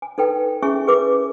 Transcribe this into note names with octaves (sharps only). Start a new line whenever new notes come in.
G#5
D#4 A4 B4 G5
C#4 E4 G#4 E5 G#5 C#6
G#4 A#4 B4 E5 D6